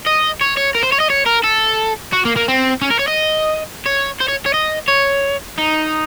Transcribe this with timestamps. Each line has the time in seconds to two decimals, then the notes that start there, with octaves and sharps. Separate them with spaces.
0.07 D#5
0.41 C#5
0.57 C#5
0.75 A#4
0.83 C5
0.93 C#5
1.01 D#5
1.10 C#5
1.26 A#4
1.44 A4
2.13 F#4
2.25 A#3
2.36 A#3
2.48 C4
2.82 C#4
2.91 A#4
3.00 C#5
3.08 D#5
3.86 C#5
4.20 C5
4.28 C#5
4.46 C#5
4.54 D#5
4.88 C#5
5.58 D#4